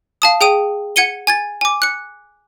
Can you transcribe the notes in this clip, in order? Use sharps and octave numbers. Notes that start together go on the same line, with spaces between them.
F5 A5 D#6
G#4 G5 D#6 D#7
F#5 G#6 C#7 D#7 G7
G#5 G#6 A6
G#5 D6
F#6 C#7